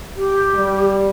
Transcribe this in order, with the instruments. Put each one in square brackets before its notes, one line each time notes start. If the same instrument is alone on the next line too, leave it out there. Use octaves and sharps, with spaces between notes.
[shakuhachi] G4
[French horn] G3